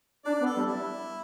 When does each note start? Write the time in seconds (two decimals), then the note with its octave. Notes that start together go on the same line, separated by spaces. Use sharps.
0.25 D4 D5
0.41 B3
0.46 A4
0.56 G3
0.66 E4